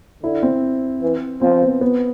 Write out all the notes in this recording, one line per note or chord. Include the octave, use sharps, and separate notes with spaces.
D3 E4
C4
E3
F3 C4
B3
B3